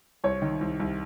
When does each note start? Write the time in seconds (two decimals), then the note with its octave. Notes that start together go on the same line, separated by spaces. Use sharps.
0.24 C2 C#5
0.42 D#3
0.61 C2
0.80 C2